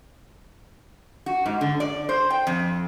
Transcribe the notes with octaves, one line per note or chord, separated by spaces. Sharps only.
F#4
G#2
D3
D5
C5
G5
F2